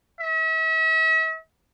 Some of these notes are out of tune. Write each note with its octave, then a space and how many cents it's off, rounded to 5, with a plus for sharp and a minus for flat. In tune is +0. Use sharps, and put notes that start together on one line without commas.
E5 -40